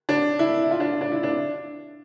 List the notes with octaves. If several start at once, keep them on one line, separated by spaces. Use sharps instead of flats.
D4
E4
F4
D4
D4
E4
D4